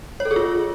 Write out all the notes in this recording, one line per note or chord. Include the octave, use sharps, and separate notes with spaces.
C#5
A4
G#4
F4